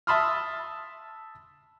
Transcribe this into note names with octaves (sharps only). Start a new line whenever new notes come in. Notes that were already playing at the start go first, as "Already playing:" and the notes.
E5 A5 B5 C6 D#6 F6